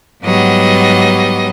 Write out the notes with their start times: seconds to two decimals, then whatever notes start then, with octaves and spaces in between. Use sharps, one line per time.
0.23 G#2 F#3 G3 B3 D#5